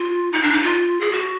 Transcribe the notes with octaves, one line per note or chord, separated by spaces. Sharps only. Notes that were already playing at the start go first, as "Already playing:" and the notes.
Already playing: F4
D#4
D4
D#4
F4
G#4
F#4